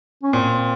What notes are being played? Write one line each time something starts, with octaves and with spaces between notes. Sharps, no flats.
C#4
A#2 C4